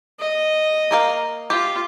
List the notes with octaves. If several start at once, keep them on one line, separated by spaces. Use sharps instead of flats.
D#5
A#3 A#4 F5
F4 G4